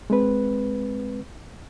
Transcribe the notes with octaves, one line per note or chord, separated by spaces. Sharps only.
G#3 C4 B4